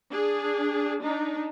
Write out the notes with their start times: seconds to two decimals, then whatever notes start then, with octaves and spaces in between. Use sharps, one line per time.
0.12 D4 G#4
1.02 D4 D#4